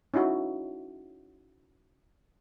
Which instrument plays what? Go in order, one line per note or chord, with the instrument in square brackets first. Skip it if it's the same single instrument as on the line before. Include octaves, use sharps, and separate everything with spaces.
[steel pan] C#4 D#4 E4 F#4